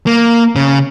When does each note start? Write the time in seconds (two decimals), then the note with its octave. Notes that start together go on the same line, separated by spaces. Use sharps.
0.06 A#3
0.56 C#3